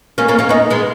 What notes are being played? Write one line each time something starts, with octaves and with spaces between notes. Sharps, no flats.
A#3 C#4
A#3 C#4
A#3 C#4
B3 D#4
G#3 B3